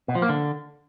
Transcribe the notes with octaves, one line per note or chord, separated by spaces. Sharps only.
B2
F3
A#3
D3